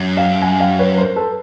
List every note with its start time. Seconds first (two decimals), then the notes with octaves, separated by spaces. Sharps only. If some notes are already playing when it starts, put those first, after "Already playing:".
Already playing: F#2
0.17 F5 G5
0.42 F#5 G#5
0.60 F5 G5
0.79 B4 C#5
0.98 A#4 C5
1.16 A4 B4